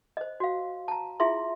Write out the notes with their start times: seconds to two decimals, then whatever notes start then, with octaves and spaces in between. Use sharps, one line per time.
0.17 C5 D#5
0.40 F#4 F5
0.88 A5 A#5
1.20 E4 F4 G#4 E5 C6